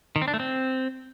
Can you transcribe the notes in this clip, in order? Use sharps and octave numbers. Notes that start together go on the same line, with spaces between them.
D#3
C4
D4
A3
C4